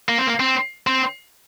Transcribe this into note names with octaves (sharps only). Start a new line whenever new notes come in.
A#3
C4
A#3
C4
C4